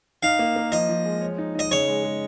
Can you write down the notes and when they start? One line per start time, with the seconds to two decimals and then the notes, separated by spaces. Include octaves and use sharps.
0.23 D#4 F5
0.39 A#3
0.56 A#3
0.72 F3 D#5
0.89 F3
1.05 G#3
1.21 C#5
1.38 D#4
1.55 D#4 D#5
1.71 C#3 C#5
1.88 G#3
2.04 G#3